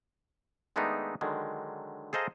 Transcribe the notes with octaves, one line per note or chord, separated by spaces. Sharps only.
D#3 G#3 A3 B3 D4 D#4
D3 D#3 F#3 G#3
G#4 A4 C5 D#5 F5 A#5